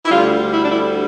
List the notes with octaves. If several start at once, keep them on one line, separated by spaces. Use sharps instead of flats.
E4
D2 D3 G3 F4
E4
D4
E4